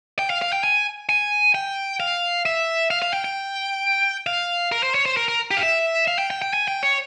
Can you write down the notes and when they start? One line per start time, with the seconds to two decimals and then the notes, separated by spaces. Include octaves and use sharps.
0.19 G5
0.30 F5
0.42 F5
0.53 G5
0.64 G#5
1.09 G#5
1.55 G5
2.00 F5
2.45 E5
2.90 F5
3.02 F5
3.13 G5
3.25 G5
4.27 F5
4.72 A#4
4.83 C5
4.95 C#5
5.06 C5
5.17 A#4
5.28 A#4
5.51 G4
5.57 F5
5.63 E5
6.07 F5
6.19 G5
6.30 G5
6.42 G5
6.53 G#5
6.68 G5
6.83 C#5